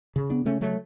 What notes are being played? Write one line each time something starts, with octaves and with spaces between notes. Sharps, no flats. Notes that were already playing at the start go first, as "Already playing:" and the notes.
C#3
B3 D4
C#3 A3 C#4
F#3 A3